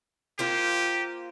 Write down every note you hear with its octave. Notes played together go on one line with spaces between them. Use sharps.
A#3 F4 G4 C5